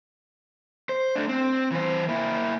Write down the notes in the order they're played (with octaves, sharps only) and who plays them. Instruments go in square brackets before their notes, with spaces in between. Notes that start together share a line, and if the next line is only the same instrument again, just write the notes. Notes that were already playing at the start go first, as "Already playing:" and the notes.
[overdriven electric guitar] C5
A3 D4
C4
E3 C5
A#3 E4